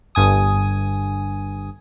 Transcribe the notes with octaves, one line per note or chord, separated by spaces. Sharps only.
G1 G2 G#5 D#6